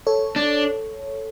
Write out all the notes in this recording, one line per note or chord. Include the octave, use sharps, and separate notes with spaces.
A4 C#5
D4